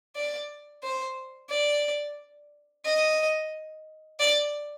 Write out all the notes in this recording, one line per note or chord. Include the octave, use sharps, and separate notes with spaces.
D5
C5
D5
D#5
D5